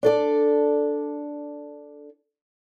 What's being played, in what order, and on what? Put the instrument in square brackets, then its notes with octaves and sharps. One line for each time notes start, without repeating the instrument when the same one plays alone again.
[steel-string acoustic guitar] D4 A4 D5